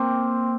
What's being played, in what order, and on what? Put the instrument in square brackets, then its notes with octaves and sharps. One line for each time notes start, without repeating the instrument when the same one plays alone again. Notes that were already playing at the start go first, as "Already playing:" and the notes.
Already playing: [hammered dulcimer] A#3 C4